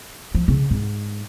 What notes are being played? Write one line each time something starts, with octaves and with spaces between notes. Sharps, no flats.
F3
C#3
G#2